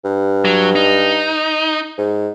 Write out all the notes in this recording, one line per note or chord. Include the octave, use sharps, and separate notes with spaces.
G2
F#3
D#4
G#2